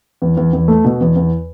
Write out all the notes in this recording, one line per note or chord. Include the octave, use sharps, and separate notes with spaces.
E2
E2
E2
A3
B2
E2
E2